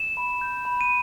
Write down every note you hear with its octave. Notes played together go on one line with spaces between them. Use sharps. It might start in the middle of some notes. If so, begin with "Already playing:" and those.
Already playing: E7
B5
G6
B5
D#7